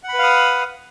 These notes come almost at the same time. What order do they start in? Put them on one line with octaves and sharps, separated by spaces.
F#5 B5 B4 F5 D#6